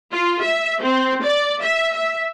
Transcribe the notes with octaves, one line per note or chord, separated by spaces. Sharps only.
F4
E5
C4
D5
E5
E5